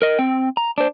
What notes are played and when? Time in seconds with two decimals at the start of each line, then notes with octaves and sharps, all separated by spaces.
0.02 A#4 D#5
0.19 C4 G5
0.57 A#5
0.78 D4 C5